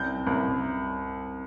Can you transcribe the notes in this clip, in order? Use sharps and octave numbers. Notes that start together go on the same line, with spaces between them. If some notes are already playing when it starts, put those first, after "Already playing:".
Already playing: C2 G6
C2